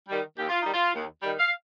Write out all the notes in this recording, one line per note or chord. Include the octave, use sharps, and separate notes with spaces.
D#3 G3
D#2 G4
F4
D#3 G3 D#4
F4
D#2
D#3 G3
F5